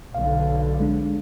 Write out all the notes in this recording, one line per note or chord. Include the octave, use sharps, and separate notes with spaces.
B1 D3 F5
G#3 D4